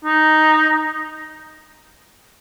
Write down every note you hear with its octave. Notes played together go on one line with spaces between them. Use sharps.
D#4